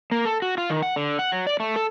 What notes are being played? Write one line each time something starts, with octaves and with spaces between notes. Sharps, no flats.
A#3
A4
F#4
F4
D#3
F#5
D3
F#5
F#3
D5
A3
A4